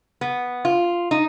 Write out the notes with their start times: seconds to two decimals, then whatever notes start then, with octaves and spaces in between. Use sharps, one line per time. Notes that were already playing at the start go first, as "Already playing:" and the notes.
0.21 B3
0.65 F4
1.11 D#4